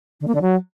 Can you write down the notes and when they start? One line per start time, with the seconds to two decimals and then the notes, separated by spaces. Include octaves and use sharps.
0.20 D3
0.27 A#3
0.34 D3
0.41 F#3